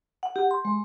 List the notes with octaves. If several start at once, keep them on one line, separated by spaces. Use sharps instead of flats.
F#5
G4
C6
G#3